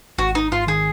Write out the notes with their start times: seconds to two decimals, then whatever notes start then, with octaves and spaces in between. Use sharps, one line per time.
0.18 G#1 F#4
0.35 G#1 D#4
0.52 G#2 F4
0.67 D#3 G#4